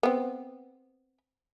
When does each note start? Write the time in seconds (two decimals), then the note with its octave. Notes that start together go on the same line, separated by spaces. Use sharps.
0.03 B3 C4